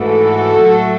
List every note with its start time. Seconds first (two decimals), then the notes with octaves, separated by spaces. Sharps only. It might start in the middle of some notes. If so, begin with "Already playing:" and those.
Already playing: G#2 E3 A3 F#4 A4
0.57 A2 F#3 A3